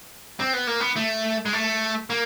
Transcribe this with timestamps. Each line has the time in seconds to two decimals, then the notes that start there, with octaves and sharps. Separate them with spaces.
0.40 C4
0.53 B3
0.67 A#3
0.80 B3
0.96 A3
1.46 G#3
1.53 A3
2.10 A#3